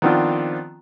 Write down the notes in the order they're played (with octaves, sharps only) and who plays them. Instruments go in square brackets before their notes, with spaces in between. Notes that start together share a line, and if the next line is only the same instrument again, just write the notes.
[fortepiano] D#3 F3 B3 C4 D4 F4